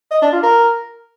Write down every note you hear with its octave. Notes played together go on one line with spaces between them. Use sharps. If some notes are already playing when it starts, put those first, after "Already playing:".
D#5
D4
F4
A#4